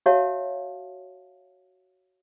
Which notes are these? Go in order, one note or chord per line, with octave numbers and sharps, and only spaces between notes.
F#4 C#5 E5 F5 A5